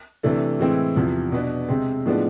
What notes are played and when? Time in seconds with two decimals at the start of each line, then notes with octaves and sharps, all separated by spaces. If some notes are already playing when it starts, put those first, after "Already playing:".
0.23 C3 E3 A3 D4
0.59 A2 E3 G#3 C4 E4
0.96 E2 C3 F3
1.32 B2 B3 D4
1.69 C3 G#3 C4
2.06 A2 F3 G#3 B3 D4